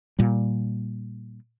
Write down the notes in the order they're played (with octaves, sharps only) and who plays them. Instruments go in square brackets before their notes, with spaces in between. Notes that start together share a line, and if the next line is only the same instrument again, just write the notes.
[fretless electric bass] A#2 G3